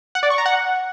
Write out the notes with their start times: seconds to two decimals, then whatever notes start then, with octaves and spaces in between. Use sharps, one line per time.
0.15 F#5
0.23 D5
0.30 C#6
0.38 A#5
0.46 F#5